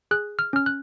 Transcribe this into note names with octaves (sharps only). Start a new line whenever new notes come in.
G#4 F#6
F6
C#4 F6
F#6